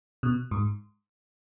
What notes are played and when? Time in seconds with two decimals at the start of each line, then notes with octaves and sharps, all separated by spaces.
0.23 B2
0.51 G#2